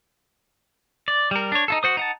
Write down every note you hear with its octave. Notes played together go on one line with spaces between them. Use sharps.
D5
G3 A#4
D4 C#5
D#4 F4 A4
F#4 C5 D#6
D#4 F#5 A5